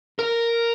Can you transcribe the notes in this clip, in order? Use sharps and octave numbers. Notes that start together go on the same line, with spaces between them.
A#4